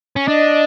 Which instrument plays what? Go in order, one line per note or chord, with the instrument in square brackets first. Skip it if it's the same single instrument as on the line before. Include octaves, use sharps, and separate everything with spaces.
[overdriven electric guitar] C#4
[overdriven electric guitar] D4 [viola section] D#5